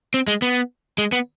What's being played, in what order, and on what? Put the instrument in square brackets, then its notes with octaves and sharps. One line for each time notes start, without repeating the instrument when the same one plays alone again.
[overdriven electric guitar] C4
G#3
B3
G#3
B3